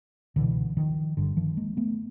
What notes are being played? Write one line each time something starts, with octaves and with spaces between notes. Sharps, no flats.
C#2 B2 D3 E3
D#3 F3
G1 G2 D3
D#3 F3
G#3 A#3
A3 B3